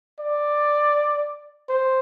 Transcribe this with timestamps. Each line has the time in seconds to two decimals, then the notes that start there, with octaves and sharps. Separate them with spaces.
0.20 D5
1.69 C5